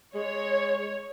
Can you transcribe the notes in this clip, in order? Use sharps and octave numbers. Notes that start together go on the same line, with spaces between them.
G#3 C#5